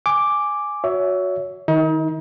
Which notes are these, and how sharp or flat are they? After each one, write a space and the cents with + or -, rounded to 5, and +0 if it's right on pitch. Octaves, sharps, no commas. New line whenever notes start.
G#5 +0 D6 +0
F#4 -15 C#5 +25 E5 +0
D#3 +0 D#4 +35